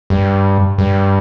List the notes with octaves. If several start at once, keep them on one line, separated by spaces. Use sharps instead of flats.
G2
G2